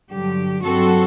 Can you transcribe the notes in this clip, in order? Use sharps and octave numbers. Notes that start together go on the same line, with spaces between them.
G2 D3 F#3 G4
G2 F#3 C4 F#4 A4